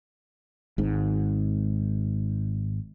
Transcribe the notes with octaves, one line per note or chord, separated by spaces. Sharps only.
G#1 G#2